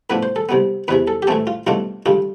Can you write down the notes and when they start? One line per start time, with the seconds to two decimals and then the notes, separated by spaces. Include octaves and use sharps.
0.10 A2 F3 B3 D4 B4
0.23 C5
0.36 A4
0.49 C2 C3 G3 B3
0.88 E2 C3 E3 B4
1.08 A4
1.22 G4
1.27 A2 E3 A3 C4 A4
1.47 F4
1.67 C2 B2 A3 D4 F4
2.06 G2 D3 G3 F4